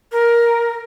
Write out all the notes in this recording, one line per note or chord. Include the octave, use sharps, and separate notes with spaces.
A#4